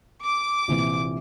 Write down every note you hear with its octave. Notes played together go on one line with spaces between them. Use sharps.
D6
A#1 C3 E3